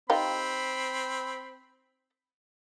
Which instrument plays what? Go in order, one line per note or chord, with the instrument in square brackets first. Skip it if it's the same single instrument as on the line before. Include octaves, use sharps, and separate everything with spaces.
[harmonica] C4 B5 [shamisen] D#4 F4 G4